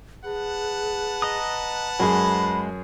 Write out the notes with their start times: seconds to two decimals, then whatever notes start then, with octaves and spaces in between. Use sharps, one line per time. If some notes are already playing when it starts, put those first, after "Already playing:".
0.24 G#4 B4 F#5 A5
1.22 D#5 A#5 D#6
2.00 F#2 G#3 G#4 B5